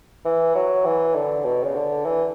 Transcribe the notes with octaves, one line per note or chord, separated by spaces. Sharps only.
E3
F#3
E3
D3
B2
C#3
D3
E3